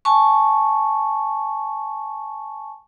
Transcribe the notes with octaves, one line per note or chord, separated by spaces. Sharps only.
G#5 A5 C#6